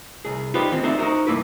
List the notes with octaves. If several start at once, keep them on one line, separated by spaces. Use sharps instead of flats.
C2 G#4
D#4 F4 G4 B4 C5 D5
D#3 E3 C4
D#4 F#4 C5 D5 E5
D#4 F#4 A#4 C5
C2 G2 A#3 E4 B4